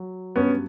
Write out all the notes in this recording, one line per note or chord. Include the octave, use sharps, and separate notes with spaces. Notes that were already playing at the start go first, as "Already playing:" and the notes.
Already playing: F#3
G2 B3 C#4